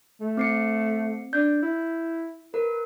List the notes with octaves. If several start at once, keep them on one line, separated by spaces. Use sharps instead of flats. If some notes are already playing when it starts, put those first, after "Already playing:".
A3
C4 C7 C#7
D4 G6
E4
A#4 B4